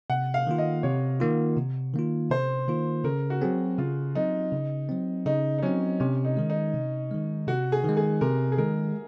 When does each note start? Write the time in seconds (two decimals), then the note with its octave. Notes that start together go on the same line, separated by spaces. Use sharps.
0.10 C3 F#5
0.34 F5
0.47 D#3 A#3 F4
0.58 D#5
0.83 C3 C#5
1.20 D#3 A#3 F4
1.57 C3
1.94 D#3 A#3 F4
2.31 C3 C5
2.68 D#3 A#3 F4
3.04 C#3 A#4
3.30 F#4
3.42 F#3 C4 G#4
3.78 C#3 F4
4.15 F#3 C4 D#4
4.52 C#3
4.89 F#3 C4
5.26 C#3 D#4
5.58 D#4
5.63 F#3 C4 C#4
6.00 C3 C#4
6.25 D#4
6.37 D#3 G#3
6.50 D#4
6.74 C3
7.11 D#3 G#3
7.48 C3 F#4
7.72 G#4
7.84 D#3 G#3
7.97 G#4
8.21 C3 A#4
8.52 G#4
8.58 D#3 G#3 A#4